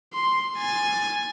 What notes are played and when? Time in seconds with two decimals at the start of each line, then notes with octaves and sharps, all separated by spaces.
0.14 C6
0.57 G#5 A6